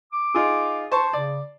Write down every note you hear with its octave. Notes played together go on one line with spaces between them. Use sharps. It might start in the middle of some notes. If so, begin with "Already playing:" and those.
D6
D#4 F4 G#4
C5 A5 C#6
C#3 D5